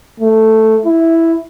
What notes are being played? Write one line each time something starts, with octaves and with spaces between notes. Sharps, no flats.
A3
E4